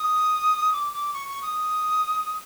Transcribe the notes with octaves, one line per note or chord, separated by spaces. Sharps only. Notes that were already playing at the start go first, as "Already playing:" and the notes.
Already playing: D#6
D6
D6
C#6
C#6
D#6